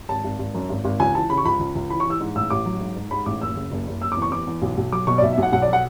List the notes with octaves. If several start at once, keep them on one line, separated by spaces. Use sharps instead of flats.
G#1 A5
G#1
G#1
F#2
G#1
G#1
C#2 G#5
E3 A5
C#3 B5
C#6
C#2 B5
C#2
C#2
E3 B5
C#6
E3 E6
G#2
A1 E6
A1 D6
F#3
G#2
G#2
G#2 B5
A1 D6
F#1 E6
C#3
F#1
F#1
F#1 E6
D6
E2
C#6
E2 D6
E2
B1
B1
F#3 D6
B2 C#6
D5
B1 E5
E5
B1 F#5
B1 F#5
D5
F#3
F#5